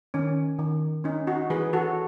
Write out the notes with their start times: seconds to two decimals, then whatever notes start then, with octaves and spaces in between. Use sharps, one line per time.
0.14 D#3 C#4
0.59 D#3
1.04 C#4 D#4
1.27 D#4 F#4
1.50 E3 G#4 B4
1.73 F#4 A4